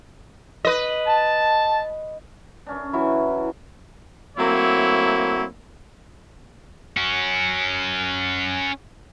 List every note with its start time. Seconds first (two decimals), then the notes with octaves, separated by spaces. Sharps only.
0.65 B4 D#5
1.06 A5
2.66 F#2 C#4 D4
2.93 E3 F#3 C#4 E4
4.37 F#3 A3 A#3 C4 E4 C#5
6.97 C#4 F#4